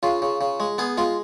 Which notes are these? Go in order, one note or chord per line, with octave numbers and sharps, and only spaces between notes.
C#3 F4
C#3
C#3
G#3
B3 G#4
G#3 F4